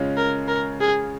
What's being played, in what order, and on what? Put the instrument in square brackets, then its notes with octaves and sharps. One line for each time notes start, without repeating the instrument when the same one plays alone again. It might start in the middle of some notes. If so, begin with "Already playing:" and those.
Already playing: [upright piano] C#3 G#3 C#4 F4
[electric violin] A#4
A#4
G#4